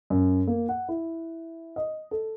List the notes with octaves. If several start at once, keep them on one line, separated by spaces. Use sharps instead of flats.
F#2
A#3
F#5
E4
D#5
A4